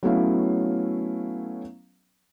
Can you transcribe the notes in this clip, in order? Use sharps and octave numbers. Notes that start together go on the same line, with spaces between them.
F#3 A3 B3 C#4 E4 F5